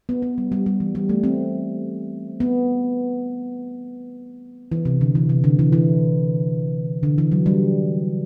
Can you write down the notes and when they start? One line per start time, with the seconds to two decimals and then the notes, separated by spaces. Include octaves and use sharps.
0.09 B3
0.22 B3
0.38 G3
0.52 G3
0.66 G3
0.80 E3
0.95 G3
1.09 A3
1.24 C4
2.40 B3
4.72 E3
4.85 C3
5.01 D3
5.15 E3
5.29 C3
5.44 D3
5.59 E3
5.73 E3
7.03 D3
7.18 E3
7.32 F#3
7.46 G3